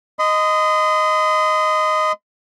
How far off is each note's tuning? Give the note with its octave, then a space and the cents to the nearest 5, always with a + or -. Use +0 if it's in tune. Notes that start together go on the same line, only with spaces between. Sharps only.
D#5 +0 C6 -45